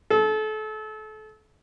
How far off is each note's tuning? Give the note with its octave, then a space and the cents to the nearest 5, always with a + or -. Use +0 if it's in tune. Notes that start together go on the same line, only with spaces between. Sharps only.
A4 -30